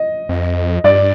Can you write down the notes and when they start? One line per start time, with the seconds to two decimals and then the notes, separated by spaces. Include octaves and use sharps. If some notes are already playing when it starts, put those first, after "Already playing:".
Already playing: D#5
0.29 F2
0.84 G2 D5